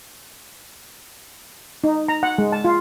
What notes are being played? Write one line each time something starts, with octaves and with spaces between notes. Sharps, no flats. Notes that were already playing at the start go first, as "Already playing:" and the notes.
D#4
A#5
F#5
G#3
A5
F4